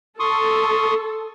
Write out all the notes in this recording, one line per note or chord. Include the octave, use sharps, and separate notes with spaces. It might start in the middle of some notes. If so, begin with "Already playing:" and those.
A4 C6 C#6 D#6